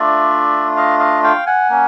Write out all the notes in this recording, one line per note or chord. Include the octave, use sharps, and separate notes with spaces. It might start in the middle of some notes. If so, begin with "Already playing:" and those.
Already playing: A3 D4 F4 D5 E5
D#5 F5
D#5 F5
F5 G5
F#5 G#5
A#3 C#4